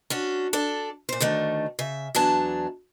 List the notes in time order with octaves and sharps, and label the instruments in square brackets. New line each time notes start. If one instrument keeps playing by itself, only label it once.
[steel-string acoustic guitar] C#4 D4 F#4
D4 A4 D5
A#2 C5
D2 D#3 A3 D4
C#3 E5
E2 F#3 D4 A5